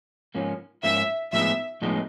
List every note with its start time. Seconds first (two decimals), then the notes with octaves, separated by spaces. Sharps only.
0.35 G#2 F3 A#3 C#4
0.83 G#2 F3 A#3 C#4 E5
1.32 A2 F3 G#3 B3 D#4 E5
1.82 A2 F3 G#3 B3 D#4